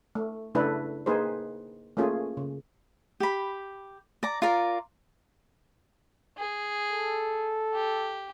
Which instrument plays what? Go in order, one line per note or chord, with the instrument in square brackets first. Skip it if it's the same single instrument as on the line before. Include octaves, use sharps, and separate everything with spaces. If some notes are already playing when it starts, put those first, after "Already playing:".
[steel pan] A3
C#3 A3 D4 E4 A4 B4
A#3 D#4 G#4 B4 C5
A3 A#3 C#4 F4 G#4
C#3
[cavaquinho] G4 B5
D5 A#5
F4 A#4 D5 A#5
[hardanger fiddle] G#4
[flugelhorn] A4
[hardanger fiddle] G4